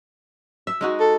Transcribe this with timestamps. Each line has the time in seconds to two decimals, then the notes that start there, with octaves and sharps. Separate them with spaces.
0.67 E5
0.81 G#3 D#4 F#4
1.00 A4